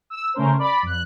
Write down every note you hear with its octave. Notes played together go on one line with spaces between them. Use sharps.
E6
C#3 A3 C#4 A#4 C5
D5 B5
F2 F#6